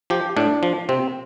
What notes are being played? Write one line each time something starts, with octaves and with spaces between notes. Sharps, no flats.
F3 G4
A2 D4
F3
C3 C4